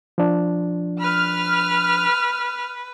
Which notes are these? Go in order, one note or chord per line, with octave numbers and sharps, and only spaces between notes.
F3 D4
B4 F6